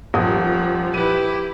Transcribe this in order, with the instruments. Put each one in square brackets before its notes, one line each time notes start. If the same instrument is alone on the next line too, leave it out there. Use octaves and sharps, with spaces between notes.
[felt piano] D#1 D#2 D#6 [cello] F3
[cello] E4 G4 [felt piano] B4 D#7